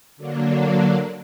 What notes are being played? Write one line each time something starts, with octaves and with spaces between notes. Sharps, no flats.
D3 F#3 A#3 D4